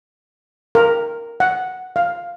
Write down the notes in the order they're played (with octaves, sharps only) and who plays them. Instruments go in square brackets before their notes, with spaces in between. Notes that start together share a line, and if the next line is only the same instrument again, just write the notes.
[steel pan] A#4
F#5
F5